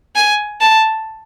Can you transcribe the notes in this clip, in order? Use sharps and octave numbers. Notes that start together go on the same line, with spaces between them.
G#5
A5